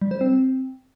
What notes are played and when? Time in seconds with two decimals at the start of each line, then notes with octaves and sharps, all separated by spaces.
0.02 G3
0.11 C5
0.21 C4